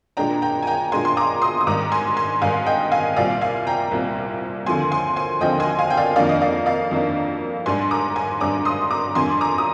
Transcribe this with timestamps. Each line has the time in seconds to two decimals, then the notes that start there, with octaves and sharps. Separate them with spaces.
0.17 A#2 G#3 D4 G5 A#5
0.42 G5 A#5
0.62 G#5
0.67 G5 A#5
0.92 A#2 G#3 D4 G#5 C6
1.05 C6
1.17 A#5 D6
1.42 C6 D#6
1.61 D#6
1.67 G#2 D#3 G3 A#5 D6
1.92 G#5 C6
2.17 G#5 C6
2.41 G#2 D#3 G3 F5 G#5
2.66 D#5 G5
2.92 F5 G#5
3.16 C2 A#2 G3 C4 D5 F5
3.41 F5 G#5
3.67 G5 A#5
3.91 C2 A#2 G3 C4
4.66 D#2 D3 F3 C4 G#5 C6
4.92 G#5 C6
5.16 G#5 C6
5.41 D#2 D3 F3 C4 D#5 G5
5.60 G#5 C6
5.79 F5 G#5
5.90 G5
5.97 D5 F5
6.16 F2 D#3 A#3 D4 D5 F5
6.29 D#5
6.41 D5 F5
6.66 D5 F5
6.91 F2 D#3 A#3 D4
7.66 G#2 G3 D4 G#5 C6
7.91 A#5 D6
8.16 G#5 C6
8.40 G#2 G3 D4 A#5 D6
8.65 C6 D#6
8.91 A#5 D6
9.15 F2 C3 G3 D4 G#5 C6
9.41 A#5 D6
9.58 D#6